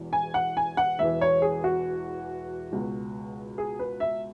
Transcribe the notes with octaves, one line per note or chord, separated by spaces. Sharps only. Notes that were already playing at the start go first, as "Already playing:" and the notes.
Already playing: E1 E2
G#5
F#5
G#5
F#5
E1 E2 E3 E5
C#5
G#4
F#4
C#2 B2
G#4
B4
E5